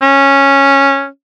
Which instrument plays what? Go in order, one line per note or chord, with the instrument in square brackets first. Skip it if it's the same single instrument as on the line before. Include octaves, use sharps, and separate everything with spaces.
[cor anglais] C#4